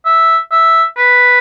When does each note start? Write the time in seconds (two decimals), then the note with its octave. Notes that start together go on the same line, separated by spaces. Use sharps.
0.05 E5
0.51 E5
0.97 B4